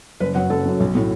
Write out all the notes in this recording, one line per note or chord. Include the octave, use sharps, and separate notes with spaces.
F#1 B4
F#2 F#3 F#5
F#1 A4
F#2 F#3
B1
A2 F#3 A3